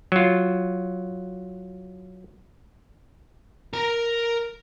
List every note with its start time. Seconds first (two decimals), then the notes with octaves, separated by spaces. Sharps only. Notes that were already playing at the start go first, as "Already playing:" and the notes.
0.12 F#3 F4
3.74 A#4 A#5